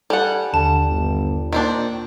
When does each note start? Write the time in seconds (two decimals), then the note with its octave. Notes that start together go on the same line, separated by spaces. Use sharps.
0.10 G3 A4 F#5 G#5 A5
0.54 D#2 D3 A5
0.88 G1
1.53 A#2 D#3 C4 D4